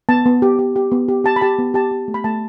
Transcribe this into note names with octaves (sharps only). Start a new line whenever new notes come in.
B3 A5
B3
G4
G4
G4
B3
G4
G4 A5
B5
G4 A5
B3
G4 A5
G4
A3
B5
A3 A5